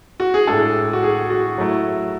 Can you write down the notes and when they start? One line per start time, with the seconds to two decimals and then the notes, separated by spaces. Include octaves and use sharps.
0.20 F#4
0.34 G#4
0.47 A2 G#3 D4 A4
0.93 F#4
1.03 G#4
1.30 F#4
1.58 F#3 A3 E4